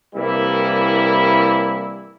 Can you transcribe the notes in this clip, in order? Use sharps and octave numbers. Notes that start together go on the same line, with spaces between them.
C2 E3 G3 A#3 E4